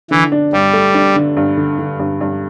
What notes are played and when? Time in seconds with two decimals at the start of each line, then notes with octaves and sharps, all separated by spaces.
0.11 D3 E3
0.32 D4
0.53 G2 G3
0.73 A3
0.94 D4
1.16 D3
1.37 G2
1.57 D3
1.79 D3
2.00 G2
2.21 G2